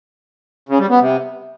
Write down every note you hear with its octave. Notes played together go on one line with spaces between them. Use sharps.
C#3
G3
B3
C3